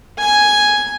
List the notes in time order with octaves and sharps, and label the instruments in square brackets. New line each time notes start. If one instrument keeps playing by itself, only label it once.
[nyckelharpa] G#5